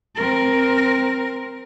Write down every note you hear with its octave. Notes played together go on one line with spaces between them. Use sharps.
C4 A#4